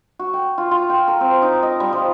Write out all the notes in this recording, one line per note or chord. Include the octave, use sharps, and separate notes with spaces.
F#4
G5
F4
F4
G5
A#4
C4
D#4
D#5
G3
F3